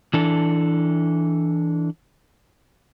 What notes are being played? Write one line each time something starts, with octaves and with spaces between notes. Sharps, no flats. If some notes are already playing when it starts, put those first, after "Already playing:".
E3 D4 A4